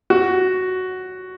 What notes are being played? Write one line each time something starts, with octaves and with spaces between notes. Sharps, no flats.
F#4